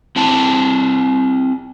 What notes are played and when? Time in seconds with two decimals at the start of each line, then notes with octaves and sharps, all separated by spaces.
0.16 C4 E4 A5